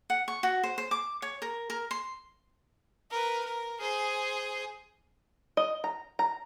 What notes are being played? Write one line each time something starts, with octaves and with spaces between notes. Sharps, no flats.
F#5
C#6
F#4
C5
C5
D6
C#5
A#4
A#4
C6
A#4 B4
A#4
G#4 C5
D#5
A#5
A#5